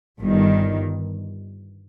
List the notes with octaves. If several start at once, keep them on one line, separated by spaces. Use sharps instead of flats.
G1 G2 D#3